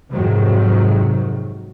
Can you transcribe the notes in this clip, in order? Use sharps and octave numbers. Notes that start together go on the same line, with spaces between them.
F2 G#2 C3 D#3 F#3